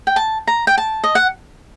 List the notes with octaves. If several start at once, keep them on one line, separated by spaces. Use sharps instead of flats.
G5
A5
A#5
G5
A5
D#5
F#5